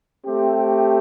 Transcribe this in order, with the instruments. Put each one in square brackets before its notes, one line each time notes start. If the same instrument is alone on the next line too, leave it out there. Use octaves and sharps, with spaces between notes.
[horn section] A3 C4 G4